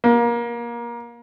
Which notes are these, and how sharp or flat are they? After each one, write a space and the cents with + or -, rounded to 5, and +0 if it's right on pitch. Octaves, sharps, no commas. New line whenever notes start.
A#3 +25